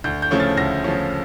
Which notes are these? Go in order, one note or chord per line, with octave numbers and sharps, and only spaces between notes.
D2 G6
G6
C#3 F3 A3 C#4
A6
D2 A#6
C#3 F3 A3 C#4